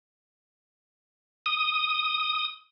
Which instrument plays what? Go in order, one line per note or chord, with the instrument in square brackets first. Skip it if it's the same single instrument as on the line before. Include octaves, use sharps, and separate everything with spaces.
[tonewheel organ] D#6